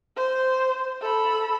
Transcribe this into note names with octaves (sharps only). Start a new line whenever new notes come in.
C5
A4 B5